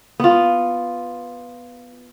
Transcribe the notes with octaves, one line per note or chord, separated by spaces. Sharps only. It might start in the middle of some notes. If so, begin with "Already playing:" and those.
B3 F4